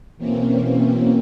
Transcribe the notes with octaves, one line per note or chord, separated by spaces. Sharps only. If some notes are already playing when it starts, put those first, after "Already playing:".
B2 E3 A#3 C4 C#4